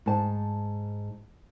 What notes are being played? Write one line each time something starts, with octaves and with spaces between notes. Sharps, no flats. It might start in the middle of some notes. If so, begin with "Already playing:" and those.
G#2 A5